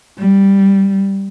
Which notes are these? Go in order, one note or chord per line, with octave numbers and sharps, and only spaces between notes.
G3